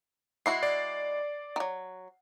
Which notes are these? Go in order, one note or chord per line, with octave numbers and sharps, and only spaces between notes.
G#3 E4 F#4 C7
D5
D#3 F#3